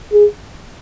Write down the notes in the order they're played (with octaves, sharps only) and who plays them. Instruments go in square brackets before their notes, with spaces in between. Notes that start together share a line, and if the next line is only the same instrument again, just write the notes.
[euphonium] G#4